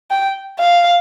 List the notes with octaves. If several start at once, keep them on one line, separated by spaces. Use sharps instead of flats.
G5
F5